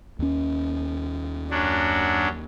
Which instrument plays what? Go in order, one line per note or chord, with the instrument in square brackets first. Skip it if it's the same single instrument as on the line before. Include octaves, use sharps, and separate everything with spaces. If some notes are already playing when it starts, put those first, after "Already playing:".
[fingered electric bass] D#2 C#4
[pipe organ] F#2 F#3 D4